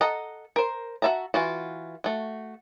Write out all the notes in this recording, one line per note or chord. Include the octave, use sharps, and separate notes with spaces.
A4 D#5 F#5 A#5
A#4 C5
F#4 B4 E5 A5 A#5
E3 F4 F#4
A3 F#4